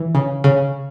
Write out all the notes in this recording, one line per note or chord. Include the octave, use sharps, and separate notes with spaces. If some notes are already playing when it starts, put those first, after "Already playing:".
Already playing: E3
C#3
C#3